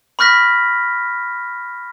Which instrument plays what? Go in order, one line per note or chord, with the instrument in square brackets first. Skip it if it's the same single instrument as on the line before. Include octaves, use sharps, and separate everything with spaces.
[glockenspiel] B5 C#6 F6 F#6 A#6 B6